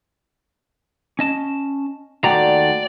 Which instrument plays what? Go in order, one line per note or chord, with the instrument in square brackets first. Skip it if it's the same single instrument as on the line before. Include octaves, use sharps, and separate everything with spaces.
[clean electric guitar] C#4 D#5 A5
[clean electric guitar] D#2 A3 A#5 [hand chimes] F#4 F#5 G5 [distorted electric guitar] D5